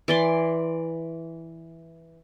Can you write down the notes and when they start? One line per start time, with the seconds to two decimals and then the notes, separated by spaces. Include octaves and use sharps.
0.08 E3 D5 C6